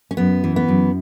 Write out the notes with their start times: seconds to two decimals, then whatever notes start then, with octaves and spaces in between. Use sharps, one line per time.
0.11 C#4
0.17 F#2 B3
0.44 E3
0.56 B3
0.69 F#2